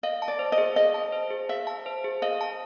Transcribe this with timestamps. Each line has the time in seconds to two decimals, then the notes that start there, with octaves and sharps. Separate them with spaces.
0.03 D#5 F5
0.22 A5
0.28 D5
0.39 C5
0.52 D#5
0.58 G#4
0.76 D#5 F5
0.94 A5
1.12 C5
1.30 G#4
1.49 E5 F5
1.67 A5
1.86 C5
2.04 G#4
2.22 D#5 F5
2.41 A5